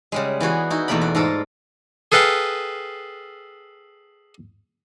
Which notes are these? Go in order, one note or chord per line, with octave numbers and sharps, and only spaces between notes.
C#3 G3 G#3
E3 B3 F#4 G#4
D#4 E4 F#4
E2 B2 A3 A#3 D5 B5
F#4
G#2 F4 A4 A#4
G#4 A4 B4 F5 G5